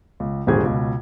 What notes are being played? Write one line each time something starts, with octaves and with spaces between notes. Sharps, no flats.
C#2
D#1 G#1 D3 G4 G#4 G#6
C#2 B2